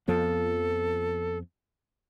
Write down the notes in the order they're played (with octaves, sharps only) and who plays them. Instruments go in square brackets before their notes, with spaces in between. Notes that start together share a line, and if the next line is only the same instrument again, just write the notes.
[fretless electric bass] F2 F3 B3 [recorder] A4